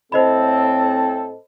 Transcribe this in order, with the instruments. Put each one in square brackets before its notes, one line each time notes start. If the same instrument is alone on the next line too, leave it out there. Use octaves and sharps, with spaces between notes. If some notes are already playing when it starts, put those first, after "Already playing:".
[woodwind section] A2 C4 [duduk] A4 [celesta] C5 D#5 B5